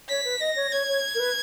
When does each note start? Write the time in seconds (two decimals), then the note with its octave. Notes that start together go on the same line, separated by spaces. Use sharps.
0.09 C#5 B6
0.25 B4
0.40 D#5 A#6
0.56 C#5
0.72 C#5 G#6
0.88 C#5
1.15 A#4
1.20 B4